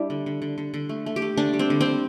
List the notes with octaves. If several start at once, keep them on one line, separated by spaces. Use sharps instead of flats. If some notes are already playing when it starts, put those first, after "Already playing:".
Already playing: G3 D4 E4
D3
D3
D3
D3
D3
A3
A3
G4
A3
D3 D4
G3
C4
D3
C4
D3